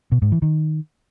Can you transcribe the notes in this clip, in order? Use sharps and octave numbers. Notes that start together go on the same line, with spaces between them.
B2
G#2
E3
D#3